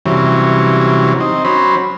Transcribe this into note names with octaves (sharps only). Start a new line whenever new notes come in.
C3 E3 F#3 G3 C#4
C4 D#4
F#3 C#4 C5 B5